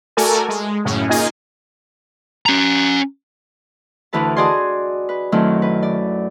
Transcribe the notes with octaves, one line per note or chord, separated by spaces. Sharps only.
A3 F#4 A4 A#4 D5 G#5
G#3
F#2 A2 C#3 C#4
A#3 D#4 F4 G#4 D#5 G#5
C#4 A#5
D2 E3 E4 B4 A5
F#4 G#4 D5 D#5 G#5 C6
B4
F#2 D#3 F#3 A3 C4 E4
B4
D5